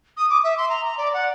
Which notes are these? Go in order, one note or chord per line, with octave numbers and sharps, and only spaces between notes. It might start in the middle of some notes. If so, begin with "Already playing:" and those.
D#6
D6
E5
C6
A#5
A#5
D5
F#5